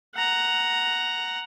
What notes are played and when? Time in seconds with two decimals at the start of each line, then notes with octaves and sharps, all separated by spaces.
0.15 F#5 A#5